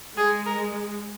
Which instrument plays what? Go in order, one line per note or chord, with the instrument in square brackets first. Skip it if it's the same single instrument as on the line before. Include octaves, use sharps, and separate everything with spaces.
[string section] G#3 [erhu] G#4
[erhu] A#4